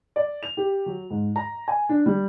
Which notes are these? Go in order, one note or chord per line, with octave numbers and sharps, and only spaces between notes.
D5
F7
G4
F#3
G#2
A#5
G#5
D4
G3